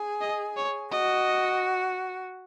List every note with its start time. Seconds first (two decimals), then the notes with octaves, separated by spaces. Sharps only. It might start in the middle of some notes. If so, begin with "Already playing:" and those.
Already playing: G#4
0.21 D#5
0.57 C#5
0.92 F#4 D#5